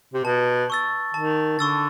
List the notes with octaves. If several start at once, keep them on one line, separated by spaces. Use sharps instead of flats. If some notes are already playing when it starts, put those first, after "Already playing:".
C3
B2 A5
C#6 E6 A6
D#3 A5
D3 C#6 E6 A6